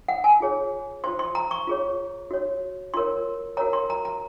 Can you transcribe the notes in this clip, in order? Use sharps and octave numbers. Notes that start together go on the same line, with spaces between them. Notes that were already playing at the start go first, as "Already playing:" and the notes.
F#5
G#5
F4 G#4 C#5
F4 C5 C6
C6
A#5
C#6
F4 G#4 C#5
F#4 C#5
F4 A#4 C#5 C6
F#4 A#4 C#5 A#5
C6
A#5
A#5